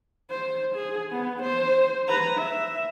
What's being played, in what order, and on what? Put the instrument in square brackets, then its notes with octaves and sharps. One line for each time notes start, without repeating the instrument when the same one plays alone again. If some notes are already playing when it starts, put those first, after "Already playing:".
[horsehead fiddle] C5
G#4
B3
C5
B4 A#5
E5